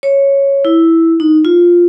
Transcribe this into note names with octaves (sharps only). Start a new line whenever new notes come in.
C#5
E4
D#4
F4